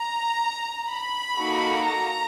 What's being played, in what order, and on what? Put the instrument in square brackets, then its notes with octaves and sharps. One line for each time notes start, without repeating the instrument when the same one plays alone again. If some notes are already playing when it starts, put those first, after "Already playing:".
Already playing: [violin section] A#5
B5
A#3 D#4 F#4 A4
A#5